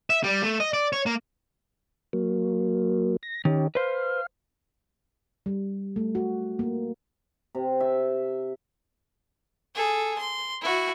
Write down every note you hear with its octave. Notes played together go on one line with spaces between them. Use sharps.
E5
G3
A3
D#5
D5
C#5
A#3
F#3 A#3
A#6
D#3 C#4 G4
B4 C5 F5
G3
A3
F#4
A#3
C3
E5
G#4 A4
C6
E4 F#4